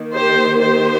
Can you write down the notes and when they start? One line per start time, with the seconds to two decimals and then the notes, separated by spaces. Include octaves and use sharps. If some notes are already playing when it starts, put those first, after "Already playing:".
Already playing: D#3 A#3
0.13 G4 C5
0.61 G4 C5